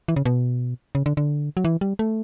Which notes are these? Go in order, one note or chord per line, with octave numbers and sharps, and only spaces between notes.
E3
C#3
B2
C#3
D3
D3
F#3
E3
G3
A3